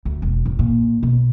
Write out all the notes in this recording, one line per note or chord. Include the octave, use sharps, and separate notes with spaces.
D2
E1
A1
A#2
B2